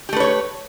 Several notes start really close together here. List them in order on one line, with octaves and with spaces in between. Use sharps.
G4 A3 B4 C#5